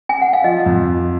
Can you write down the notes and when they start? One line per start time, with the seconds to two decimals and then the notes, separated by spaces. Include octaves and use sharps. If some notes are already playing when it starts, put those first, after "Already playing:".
0.09 G#5
0.22 F#5
0.33 F5
0.44 F3 D#5
0.66 F2
0.87 F3